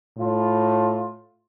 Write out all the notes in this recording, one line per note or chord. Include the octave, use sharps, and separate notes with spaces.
A2 F4